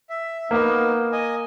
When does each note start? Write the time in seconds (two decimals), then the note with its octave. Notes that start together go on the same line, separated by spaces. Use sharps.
0.10 E5
0.51 A#3 B3 D#4
1.12 D#5 G#5